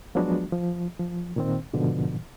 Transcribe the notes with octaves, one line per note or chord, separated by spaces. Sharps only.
F3 F#3 G#3 B3 D4 F#4
F3
F3
A#2 D#3 C4
G#2 B2 D3 F3